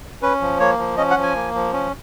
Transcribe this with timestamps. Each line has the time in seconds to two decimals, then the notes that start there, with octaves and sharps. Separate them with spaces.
0.22 C#4 B4
0.41 F3
0.60 A#3 C#5
0.78 F3
0.98 C#4 D#5
1.10 F#5
1.17 F3
1.23 G#5
1.36 A#3
1.55 F3
1.73 C#4